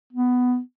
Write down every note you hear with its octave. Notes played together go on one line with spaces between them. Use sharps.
B3